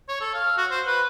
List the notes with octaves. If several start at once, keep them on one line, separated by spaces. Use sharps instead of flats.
C#5
A4
F5
F#4
C5
B4